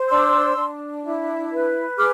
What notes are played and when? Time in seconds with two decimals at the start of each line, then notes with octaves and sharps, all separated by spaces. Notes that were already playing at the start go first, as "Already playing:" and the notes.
Already playing: C5
0.08 D4 C6 E6
0.57 D4
1.03 E4
1.51 B4
1.97 G#4 D6 F6